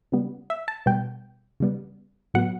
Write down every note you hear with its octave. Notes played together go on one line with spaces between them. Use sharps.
C#3 G3 B3
E5
A5
B2 G3 B3 G5
C#3 G3 B3
A2 F#3 B3 F#5